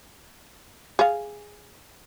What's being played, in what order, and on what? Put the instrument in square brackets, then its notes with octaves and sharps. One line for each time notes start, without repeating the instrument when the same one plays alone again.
[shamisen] G#4 F5